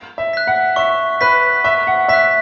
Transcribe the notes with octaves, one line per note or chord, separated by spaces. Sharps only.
E5
F#6 B6
F#5
E5 C#6
B4 F#6 B6
E5 C#6
F#5
E5 F#6 B6